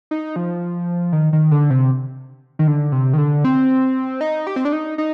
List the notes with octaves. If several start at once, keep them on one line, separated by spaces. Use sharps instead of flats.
D#4
F3
D#3
D#3
D3
C3
D#3
D3
C3
D#3
D3
C4
D#4
G4
C4
D4
D#4
D#4